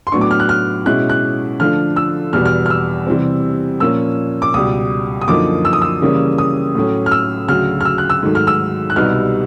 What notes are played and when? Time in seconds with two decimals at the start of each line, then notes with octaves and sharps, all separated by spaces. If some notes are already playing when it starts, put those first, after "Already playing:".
0.07 C6
0.12 A2 F#3 B3 D4 C#6
0.21 D6
0.31 F6
0.40 F#6
0.49 F6
0.86 B2 G#3 C#4 E4 F#6
1.09 F#6
1.60 D3 F3 A3 D4 F4 F6
1.96 E6
2.33 E2 B2 G3 B3 F6
2.45 F6
2.66 F6
2.70 E6
3.07 C3 E3 G3 C4
3.80 A#2 F3 A#3 C#4 E6
4.42 D6
4.54 C#2 B2 G3 D#6
5.21 D#6
5.28 F#2 D3 F3 A#3 D#4 D6
5.65 E6
5.73 D#6
5.82 E6
6.01 C#3 E3 G3 A#3 C#4
6.38 D#6
6.75 A2 F#3 A3 C#4
7.06 F6
7.11 E6
7.48 D2 C#3 F#3 F6
7.81 F6
7.85 E6
7.98 F#6
8.10 E6
8.23 G#2 D#3 F#3 A3
8.35 F6
8.47 E6
8.90 F#6
8.96 C2 B2 G3 B3 D#4 F6